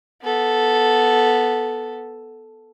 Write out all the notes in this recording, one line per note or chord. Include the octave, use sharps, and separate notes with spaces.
B3 A4